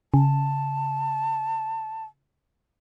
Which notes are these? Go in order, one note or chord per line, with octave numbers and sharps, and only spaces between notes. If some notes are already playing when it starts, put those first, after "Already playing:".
C#3 A5